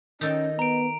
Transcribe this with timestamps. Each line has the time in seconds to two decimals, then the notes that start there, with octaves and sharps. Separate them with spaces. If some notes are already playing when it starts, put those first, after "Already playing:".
0.21 D#3 C#4 A4 D#5 G5
0.59 B3 A#5 D7